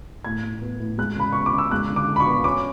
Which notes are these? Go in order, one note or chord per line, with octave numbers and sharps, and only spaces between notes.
A2 G#6
A2
B3
A2
G#3 F#6
C#3 B5
B3 C#6
D6
C#3
E6
G#3 F#6
D3
D6
D3
B5
C#6
B3
C#4 D6